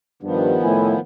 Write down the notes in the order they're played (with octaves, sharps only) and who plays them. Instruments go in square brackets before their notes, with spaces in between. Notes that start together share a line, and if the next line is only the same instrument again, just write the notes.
[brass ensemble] G2 [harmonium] D#3 F3 B3
[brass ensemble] A2 E4 G#5